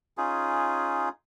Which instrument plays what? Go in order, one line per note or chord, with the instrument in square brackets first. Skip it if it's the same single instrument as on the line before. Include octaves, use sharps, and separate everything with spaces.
[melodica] C#4 D#4 F4 G#4